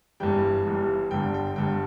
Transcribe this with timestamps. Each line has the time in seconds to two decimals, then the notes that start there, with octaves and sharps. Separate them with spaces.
0.20 G1 G2 E3 G3 G5
0.65 G1 G2 E3 G3
1.11 G1 G2 D3 G5
1.34 G5
1.56 G1 G2 D3 G5